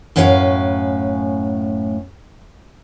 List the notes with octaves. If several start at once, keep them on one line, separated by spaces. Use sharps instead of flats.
F#2 A2 C#4 B4 F5 A#5